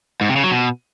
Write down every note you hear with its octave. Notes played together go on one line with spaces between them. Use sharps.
G#2
C3
C#3
F#3
B2